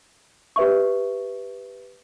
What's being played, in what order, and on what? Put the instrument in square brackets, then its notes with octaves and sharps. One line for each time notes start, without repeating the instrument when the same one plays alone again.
[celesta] G4 B4 E5 C#6